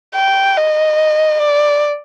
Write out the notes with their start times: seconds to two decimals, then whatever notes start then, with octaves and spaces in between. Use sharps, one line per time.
0.15 G5
0.57 D#5
1.41 D5